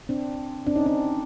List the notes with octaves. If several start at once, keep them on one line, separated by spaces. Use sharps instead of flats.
C4 D4
C4 D4
C#4 D#4
C4 D4